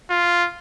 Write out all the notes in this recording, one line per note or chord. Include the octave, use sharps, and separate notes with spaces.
F4